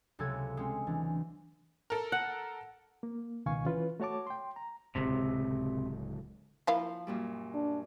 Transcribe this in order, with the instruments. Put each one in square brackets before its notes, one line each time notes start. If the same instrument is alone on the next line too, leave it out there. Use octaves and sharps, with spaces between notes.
[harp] C#2 C3 F#3 A4 E6 G#6
G#3 C4 C#4
D2 E3 D4
[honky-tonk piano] A4 A#4
[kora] F#5
[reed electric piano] A#3
C#2 B2 D#3 F5 G#5 C#6
E3 C#4 F4 B4
A3 F#4 C#5 A5 D6
G5 C6
A#5
[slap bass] D1 C#2 A2 [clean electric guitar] C3
[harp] F3 [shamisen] A#3 E4 F5
[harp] F#2 A#2 G3
[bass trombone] D4